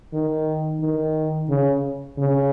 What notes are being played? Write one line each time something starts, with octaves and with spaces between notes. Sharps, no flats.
D#3
D#3
C#3
C#3